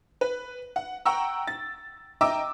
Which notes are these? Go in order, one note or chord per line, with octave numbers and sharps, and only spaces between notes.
B4
F#5
F#5 G5 A#5 C#6 E6
A6
D#5 E5 G5 A#5 D6 E6